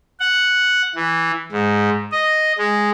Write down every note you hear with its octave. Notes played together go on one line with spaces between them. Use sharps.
F#5
E3
G#2
D#5
G#3